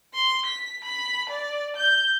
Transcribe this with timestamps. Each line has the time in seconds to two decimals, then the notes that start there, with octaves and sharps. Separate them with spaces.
0.14 C6
0.46 B6
0.84 B5
1.30 D5
1.77 G6